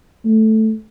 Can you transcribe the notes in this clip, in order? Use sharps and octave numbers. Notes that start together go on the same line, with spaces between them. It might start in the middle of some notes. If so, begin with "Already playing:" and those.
A3